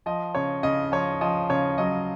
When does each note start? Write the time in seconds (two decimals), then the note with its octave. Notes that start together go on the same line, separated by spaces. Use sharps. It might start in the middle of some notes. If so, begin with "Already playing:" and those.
0.06 F3 D#5
0.35 C#3 C#5
0.63 C#3 D#5
0.92 F3 C#5
1.21 F3 D#5
1.49 C#3 C#5
1.78 F#3 D#5